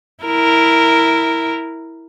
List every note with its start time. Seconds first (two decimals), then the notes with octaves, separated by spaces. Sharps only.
0.24 E4 A#4